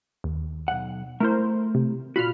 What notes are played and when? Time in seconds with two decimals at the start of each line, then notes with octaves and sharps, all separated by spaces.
0.24 D#2
0.68 B1 F#5
1.20 A3 E4 A#4 C5
1.75 C3
2.16 A#2 F4 F#4 B5 F6